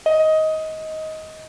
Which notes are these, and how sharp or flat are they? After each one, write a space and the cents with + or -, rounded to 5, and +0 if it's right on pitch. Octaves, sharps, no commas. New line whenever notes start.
D#5 +20